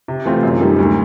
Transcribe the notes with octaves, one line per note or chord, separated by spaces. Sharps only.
C3
E3 A3 C4 F4
F#2
D#3 G3 A#3
D2